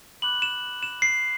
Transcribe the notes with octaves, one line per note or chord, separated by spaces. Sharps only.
B5 D6 F#6 F#7
E7
E7
C7